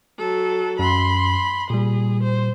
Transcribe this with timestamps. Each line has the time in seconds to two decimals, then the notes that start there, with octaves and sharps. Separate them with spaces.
0.18 F#3 A4
0.79 F#2 B5 C6
1.70 A#2 G3 G#4
2.23 C5